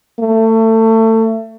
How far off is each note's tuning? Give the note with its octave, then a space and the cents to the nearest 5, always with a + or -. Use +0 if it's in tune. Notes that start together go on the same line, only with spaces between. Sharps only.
A3 +25